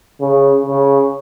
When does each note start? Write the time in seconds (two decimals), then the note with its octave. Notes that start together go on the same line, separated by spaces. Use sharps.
0.21 C#3
0.66 C#3